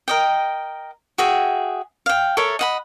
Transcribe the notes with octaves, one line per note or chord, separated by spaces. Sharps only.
A#4 D#5 G5
F#4 G#4 E5 G5
F5 G5
A4 A#4 C#5 E5
D#5 F#5 B5